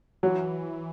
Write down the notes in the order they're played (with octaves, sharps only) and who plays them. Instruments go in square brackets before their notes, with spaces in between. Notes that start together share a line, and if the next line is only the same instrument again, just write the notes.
[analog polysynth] E3 [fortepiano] F#3